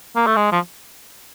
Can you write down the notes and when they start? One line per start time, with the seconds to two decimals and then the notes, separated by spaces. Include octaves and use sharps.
0.16 A#3
0.26 A3
0.36 G#3
0.52 F3